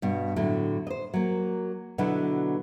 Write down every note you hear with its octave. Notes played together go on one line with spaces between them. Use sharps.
G2 B2
A2 D3 F#3
C5 D#5
F#3 A#3
B2 D3 F#3 B3 D4 E4